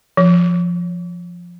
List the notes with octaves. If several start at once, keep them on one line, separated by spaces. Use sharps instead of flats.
F3